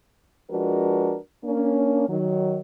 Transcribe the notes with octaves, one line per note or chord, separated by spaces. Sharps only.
F3 G#3 D4 F#4 A#4 B4
A#3 C#4 D4
D#3 F#3